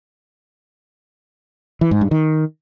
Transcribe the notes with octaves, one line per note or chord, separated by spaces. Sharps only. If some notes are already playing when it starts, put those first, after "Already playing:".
E3
G#2
G2
D#3